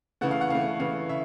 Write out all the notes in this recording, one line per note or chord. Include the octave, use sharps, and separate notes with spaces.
C#3 E3 A3 F#5
F5
F#5
C#3 E3 A3 F5
C#3 E3 A3 F5
C#3 E5